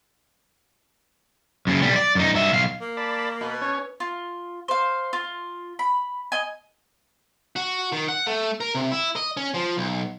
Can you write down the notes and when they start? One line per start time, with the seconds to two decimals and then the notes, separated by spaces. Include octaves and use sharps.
1.67 F#2 C#3
1.82 B1 G3
1.96 D5
2.15 F#2 D#4
2.34 G2 E5
2.53 B1 F5
2.81 A#3
2.97 D5 A5 B5
3.41 B2 B4
3.61 C#4 C#5
4.00 F4
4.68 C5 F5
5.13 F4
5.79 B5
6.32 D#5 G#5
7.56 F#4
7.92 D#3
8.09 F#5
8.27 A3
8.60 A#4
8.75 C3
8.92 E4
9.16 D#5
9.37 C#4
9.54 F3
9.78 B1